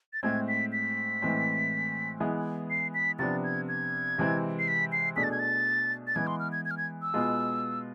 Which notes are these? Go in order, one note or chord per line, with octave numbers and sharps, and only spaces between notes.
A6
A2 G#3 C4 G#6
B6
B6
A2 E3 G#3 C4
E3 G#3 B3 E4 G#4
C7
B6
C3 F3 B3 D4 A6
G#6
G#6
C3 E3 G#3 C4 E4
C7
B6
C7
B2 A3 D4 G#4 B6
A6
G#6
A6
A6
E3 G#3 B3 G#6
C6
F6
G#6
G#6
F6
G#6
E6
B2 G#3 B3 F4 G#4